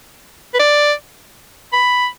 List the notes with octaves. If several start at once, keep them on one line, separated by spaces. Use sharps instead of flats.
B4
D5
B5